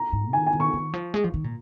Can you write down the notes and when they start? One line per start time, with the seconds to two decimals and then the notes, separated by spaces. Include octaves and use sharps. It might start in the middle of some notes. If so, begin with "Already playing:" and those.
Already playing: A#5
0.12 G#2
0.33 D#3 G#5
0.47 G#5
0.53 D#3
0.60 C#6
0.73 D#3
0.94 F3
1.14 G#3
1.24 F3
1.34 D#3
1.44 A#2